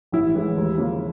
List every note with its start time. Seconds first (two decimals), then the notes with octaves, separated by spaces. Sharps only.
0.12 A1 E4
0.35 A2 E3 G#3
0.57 D#2
0.78 C#3 F3 A#3